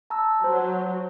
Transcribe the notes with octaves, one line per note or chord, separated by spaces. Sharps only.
A5 A#5 E6
F#3 C5